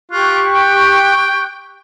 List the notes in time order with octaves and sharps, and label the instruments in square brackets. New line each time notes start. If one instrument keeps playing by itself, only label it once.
[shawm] F4 [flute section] G4 C#6 F#6
[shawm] G5